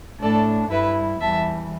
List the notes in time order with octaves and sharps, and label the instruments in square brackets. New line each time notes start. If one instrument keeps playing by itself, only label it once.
[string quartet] A2 A3 D4 A4 D5
G2 G3 E4 B4 E5
E2 E3 G3 E5 A5